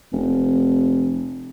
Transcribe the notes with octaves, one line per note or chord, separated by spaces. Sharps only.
F1